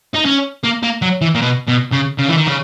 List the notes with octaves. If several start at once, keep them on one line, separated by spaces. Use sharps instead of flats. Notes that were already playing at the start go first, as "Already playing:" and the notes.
D#4
C#4
A#3
A#3
F#3
E3
A#2
B2
B2
C#3
C#3
E3
D#3
C#3